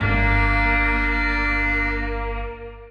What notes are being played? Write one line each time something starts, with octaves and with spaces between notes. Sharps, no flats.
G1 A#3 D4